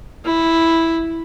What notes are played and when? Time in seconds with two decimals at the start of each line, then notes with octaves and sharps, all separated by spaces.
0.25 E4